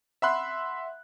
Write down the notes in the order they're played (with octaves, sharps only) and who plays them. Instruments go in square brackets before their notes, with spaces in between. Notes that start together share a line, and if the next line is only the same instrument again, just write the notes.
[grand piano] E5 F#5 B5 C6 F#6